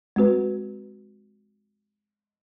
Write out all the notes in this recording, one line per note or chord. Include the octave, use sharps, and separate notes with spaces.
G#3 C4 F#4 B4